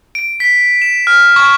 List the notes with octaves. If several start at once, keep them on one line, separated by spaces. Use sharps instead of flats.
D7
B6
E7
F6
C#6